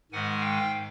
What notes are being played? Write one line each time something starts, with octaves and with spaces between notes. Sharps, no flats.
G#2 D#3 G#3 F#5 G#5
F5 G5